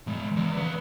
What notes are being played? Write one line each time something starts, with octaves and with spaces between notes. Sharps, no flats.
E3 G#3
E3 D5
C#4 B4